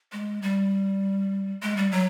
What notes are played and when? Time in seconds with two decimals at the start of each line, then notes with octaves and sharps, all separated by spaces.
0.13 G#3
0.42 G3
1.63 G#3
1.77 G3
1.91 F#3